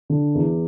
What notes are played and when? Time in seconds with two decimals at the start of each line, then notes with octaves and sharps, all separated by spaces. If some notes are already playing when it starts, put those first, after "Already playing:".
0.10 D3
0.35 E2